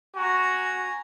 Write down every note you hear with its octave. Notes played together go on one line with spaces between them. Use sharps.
F#4 G#5 A#5